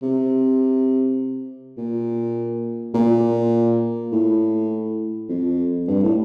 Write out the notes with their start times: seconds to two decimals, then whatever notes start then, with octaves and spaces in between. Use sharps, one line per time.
0.02 C3
1.78 A#2
2.94 A#2
4.12 A2
5.29 F2
5.88 G2
6.03 A2